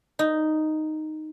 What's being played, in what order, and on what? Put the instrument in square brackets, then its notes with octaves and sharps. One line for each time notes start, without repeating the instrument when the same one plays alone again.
[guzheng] D#4